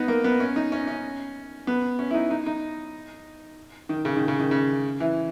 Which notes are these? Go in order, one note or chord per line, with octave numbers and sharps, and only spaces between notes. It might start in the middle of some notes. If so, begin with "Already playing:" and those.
Already playing: B3 D#4
A#3
B3
C#4
D#4
C#4
C#4
B3
C#4
E4
D#4
D#4
D#4
D#3
C#3
D#3
C#3
D#3
C#3
E3